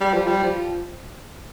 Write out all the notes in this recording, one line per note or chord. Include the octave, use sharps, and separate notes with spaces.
G3
F3
G3
F3